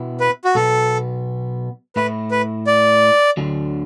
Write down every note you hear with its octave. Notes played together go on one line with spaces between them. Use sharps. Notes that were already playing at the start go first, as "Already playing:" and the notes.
Already playing: B2 B3 E4
B4
F#4
B1 B2 B3 A4
A2 A3 E4 B4
B4
D5
D2 D3 F#3 D4